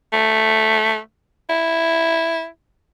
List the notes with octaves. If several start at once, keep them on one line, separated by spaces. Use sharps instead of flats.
A3
E4